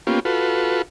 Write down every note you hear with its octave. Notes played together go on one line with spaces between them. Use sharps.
A#3 B3 C#4 F4 G4
F4 F#4 A4 B4